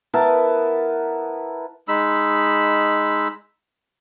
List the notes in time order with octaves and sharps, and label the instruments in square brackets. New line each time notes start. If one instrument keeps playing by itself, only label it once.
[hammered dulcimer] B3 E4 A#4 A5
[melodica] G#3 D#4 B5 E6